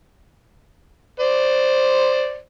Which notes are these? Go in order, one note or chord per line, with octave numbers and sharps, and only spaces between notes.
C5 D5